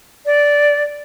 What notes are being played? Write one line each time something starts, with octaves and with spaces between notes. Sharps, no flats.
D5